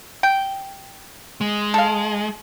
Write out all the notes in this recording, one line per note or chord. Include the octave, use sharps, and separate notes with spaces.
G5
G#3
A4 F5